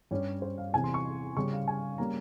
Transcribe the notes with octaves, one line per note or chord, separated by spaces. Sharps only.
G2 G3 C#4 C#5
C5
F5
E2 C3 E3 G#5
C6
C#6
C#3 G3 C#4 C#6
F5
G#5
G3 A#3 C#4 A#5